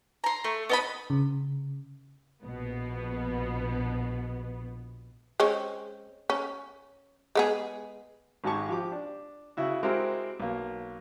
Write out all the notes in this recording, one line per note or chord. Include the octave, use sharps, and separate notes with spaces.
A#5 C6
A3
B3 D#5 B5
C#3
A#1 B2 B3
G#3 C4 C#4
C#4
G#3 B3 G#4
G#1 G#2 G#3 G4 A5 C#6
F3 G4 D6
D4
C#3 E4 F#4
G#3 C4 E4 F#4 G4 A#4
B1 A#3